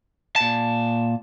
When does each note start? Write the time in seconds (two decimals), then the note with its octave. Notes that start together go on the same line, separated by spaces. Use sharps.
0.36 A#2 A5